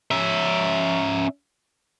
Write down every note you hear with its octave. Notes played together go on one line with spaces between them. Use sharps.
C#4 E5